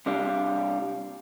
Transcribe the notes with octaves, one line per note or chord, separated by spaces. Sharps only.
C3 G3 D4 F4